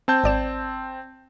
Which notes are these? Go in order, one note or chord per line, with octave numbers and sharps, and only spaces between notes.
C4 A5 G6
G#1 D5 E7